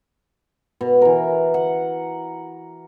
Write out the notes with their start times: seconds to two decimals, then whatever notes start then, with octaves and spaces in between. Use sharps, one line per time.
0.81 B2
1.01 E3 A#4
1.54 F#5